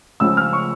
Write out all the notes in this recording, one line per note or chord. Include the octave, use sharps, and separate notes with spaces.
C#2 C#3 F3 G#3 E6
F6
C#6